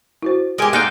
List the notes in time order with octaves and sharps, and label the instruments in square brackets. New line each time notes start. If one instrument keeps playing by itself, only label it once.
[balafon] E4 F#4 C5
[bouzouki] G#3 G4 [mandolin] A#4 G5 G#5
[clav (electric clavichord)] G#2 D#4 G5 [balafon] A#3 [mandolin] A4 D5 F#6 [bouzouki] F5